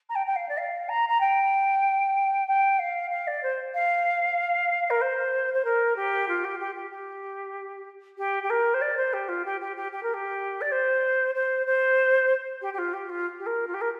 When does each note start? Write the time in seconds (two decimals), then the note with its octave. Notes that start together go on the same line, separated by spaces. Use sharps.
0.09 A#5
0.15 G5
0.27 G5
0.36 F5
0.49 D5
0.57 F5
0.89 A#5
1.09 A#5
1.20 G5
2.48 G5
2.79 F5
3.10 F5
3.27 D5
3.43 C5
3.74 F5
4.90 A#4
5.01 C5
5.54 C5
5.64 A#4
5.96 G4
6.28 F4
6.44 G4
6.60 G4
6.75 G4
6.91 G4
8.18 G4
8.43 G4
8.50 A#4
8.74 C5
8.81 D5
8.97 C5
9.13 G4
9.28 F4
9.45 G4
9.61 G4
9.76 G4
9.92 G4
10.03 A#4
10.14 G4
10.61 D5
10.72 C5
11.35 C5
11.66 C5
12.61 G4
12.73 G4
12.78 F4
12.93 G4
13.09 F4
13.39 G4
13.46 A#4
13.67 F4
13.74 G4
13.81 A#4